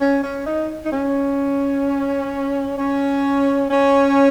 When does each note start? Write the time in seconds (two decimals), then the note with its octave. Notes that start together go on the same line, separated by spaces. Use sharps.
0.01 C#4
0.24 C#4
0.46 D#4
0.85 D#4
0.92 C#4
2.78 C#4
3.70 C#4